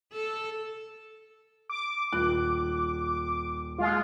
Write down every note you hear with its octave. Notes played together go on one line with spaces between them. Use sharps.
A4
D6
D#1 F#6
G#3 F4